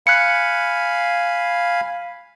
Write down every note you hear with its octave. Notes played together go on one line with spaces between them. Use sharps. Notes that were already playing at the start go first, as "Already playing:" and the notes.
F5 G#5 B5 F#6 C#7